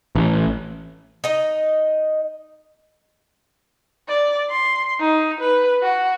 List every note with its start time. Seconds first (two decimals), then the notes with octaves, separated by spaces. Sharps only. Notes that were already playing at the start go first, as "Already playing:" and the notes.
0.15 A1
1.24 D#4 D#5
4.08 D5
4.50 C6
5.00 D#4
5.41 B4
5.83 F#4